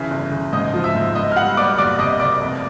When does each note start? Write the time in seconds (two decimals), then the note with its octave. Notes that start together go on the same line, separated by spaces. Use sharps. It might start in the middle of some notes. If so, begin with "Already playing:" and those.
Already playing: C#3 E3 E5
0.11 G1
0.32 C#3
0.53 G#2 D#5 D#6
0.74 F3
0.84 E5 E6
0.95 G#2
1.15 B3 D#5 D#6
1.32 F6
1.36 G3 F#5 F#6
1.57 B3 D5 D6
1.78 F#1 D5 D6
1.98 C3 D#5 D#6
2.20 C3 D5 D6
2.41 F1